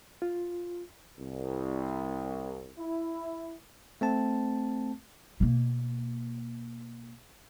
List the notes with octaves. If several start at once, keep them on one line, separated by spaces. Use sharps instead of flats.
F4
C2
E4
A3 C4 A5
B2 A#3